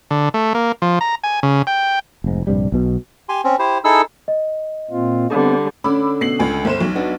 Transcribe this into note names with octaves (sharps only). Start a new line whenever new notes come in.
D3
A3
A#3
F3
A#5
G#5
C#3
G5
F1 G#2
A#1 G2 C3 G3
B1 B2
G4 G#5 C6
C4 C#4
E4 G4 C5
D#4 E4 G#4 A4 E6
D#5
A#2 C4 F4
D3 G3 B3 C4
D3 C#4 B5 D6 E6
B2 C7 F#7
C#2 G#5
G1 C5 E7
B1
B3 D4 D#4